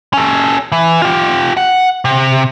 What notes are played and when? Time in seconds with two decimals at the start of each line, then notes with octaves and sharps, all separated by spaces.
0.13 C#4 A4
0.72 E3
1.02 F4 G4
1.57 F#5
2.05 C3